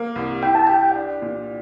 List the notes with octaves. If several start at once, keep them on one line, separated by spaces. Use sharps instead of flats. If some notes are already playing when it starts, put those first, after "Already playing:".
Already playing: A#3
C2
E4 G5
A5
G4 G5
D4
A#2